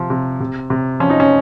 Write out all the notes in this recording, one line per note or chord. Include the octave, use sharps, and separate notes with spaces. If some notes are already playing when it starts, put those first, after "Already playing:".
Already playing: C3 F3
C3
C3
C3
F3 C#4
D#4
C#4